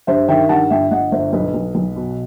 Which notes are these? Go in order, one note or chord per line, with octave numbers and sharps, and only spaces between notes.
G2 C5 E5
D#3 E5 G5
G2 F#5 A5
G1 E5 G5
G1 D#5 F#5
G1 C5 E5
B1 B4 D#5
B1
B1
B2